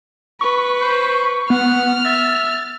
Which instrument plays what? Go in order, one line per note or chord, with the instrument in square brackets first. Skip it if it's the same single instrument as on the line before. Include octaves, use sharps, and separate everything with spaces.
[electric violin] B4 [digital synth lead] C#6
[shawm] C5
[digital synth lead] B3 [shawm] F#5 [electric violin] F6
[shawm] E5 [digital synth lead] A6